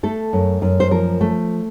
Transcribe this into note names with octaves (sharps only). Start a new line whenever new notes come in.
A3 A4
F#2
F#2
C5
F3 A#4
A3